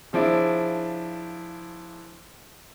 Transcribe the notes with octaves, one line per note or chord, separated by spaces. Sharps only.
C#3 F3 D4 E4